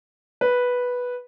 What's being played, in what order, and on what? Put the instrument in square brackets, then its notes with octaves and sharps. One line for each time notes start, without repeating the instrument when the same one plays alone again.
[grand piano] B4